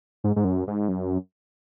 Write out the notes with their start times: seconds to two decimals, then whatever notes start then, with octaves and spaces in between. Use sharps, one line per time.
0.24 G#2
0.36 G#2
0.45 F#2
0.67 G#2
0.88 F#2